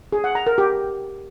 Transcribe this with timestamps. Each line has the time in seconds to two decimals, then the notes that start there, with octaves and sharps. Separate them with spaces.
0.12 G#4
0.24 F#5
0.35 A#5
0.47 A#4
0.58 G4